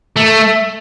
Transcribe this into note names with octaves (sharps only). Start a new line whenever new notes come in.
A3